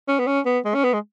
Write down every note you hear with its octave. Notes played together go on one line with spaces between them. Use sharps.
C#4
B3
C#4
B3
G#3
C#4
B3
G#3